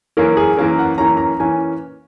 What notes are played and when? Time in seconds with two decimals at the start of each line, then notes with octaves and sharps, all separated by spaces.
0.17 F#2 E3 A#3 C#4 A#4
0.37 G#4
0.57 F#2 E3 A#3 C#4 A#4
0.79 F#5
0.98 F#2 E3 A#3 C#4 A#5
1.17 A#5
1.40 E3 A#3 C#4 G#5